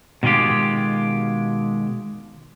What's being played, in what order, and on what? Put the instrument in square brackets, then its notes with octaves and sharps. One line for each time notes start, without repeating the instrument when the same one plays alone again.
[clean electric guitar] B2 D#3 G#3 F4 G4